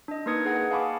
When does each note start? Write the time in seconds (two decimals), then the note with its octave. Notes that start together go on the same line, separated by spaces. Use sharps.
0.08 D4 D#5
0.26 A#3 D#4 B4 D#6 G#6 C#7
0.46 G#4 B4 F#5
0.71 F5 G#5 A5 B5 C#6 D6